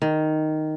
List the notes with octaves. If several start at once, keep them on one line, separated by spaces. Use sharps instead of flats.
D#3